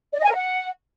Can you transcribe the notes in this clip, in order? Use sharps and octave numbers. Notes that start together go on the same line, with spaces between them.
D5
D#5
G#5
A#4
F#5